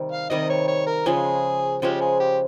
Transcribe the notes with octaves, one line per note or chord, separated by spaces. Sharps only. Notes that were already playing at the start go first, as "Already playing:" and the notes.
Already playing: C3 D#3 G3
F5
C3 D#3 G3 D#5
C#5
C#5
A#4
C#3 F3 G#3 G#4
C#3 F3 G#3 G4
G#4
G4